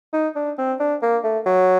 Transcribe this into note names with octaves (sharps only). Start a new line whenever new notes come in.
D#4
D4
C4
D4
A#3
A3
F#3